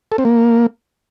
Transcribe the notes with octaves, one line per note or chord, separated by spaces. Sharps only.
A4
C4
A#3